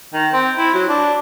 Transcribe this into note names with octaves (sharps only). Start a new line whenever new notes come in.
D#3
C4
E4
F#3
D4